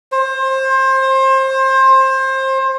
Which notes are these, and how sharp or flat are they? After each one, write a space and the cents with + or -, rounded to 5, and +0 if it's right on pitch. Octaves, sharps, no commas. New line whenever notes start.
C5 +25